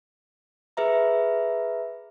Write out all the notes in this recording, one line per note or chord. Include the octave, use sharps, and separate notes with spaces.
G#4 B4 E5 A#5